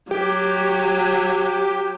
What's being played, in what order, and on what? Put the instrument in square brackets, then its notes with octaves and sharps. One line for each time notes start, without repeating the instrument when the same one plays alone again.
[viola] F#3 [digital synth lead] G4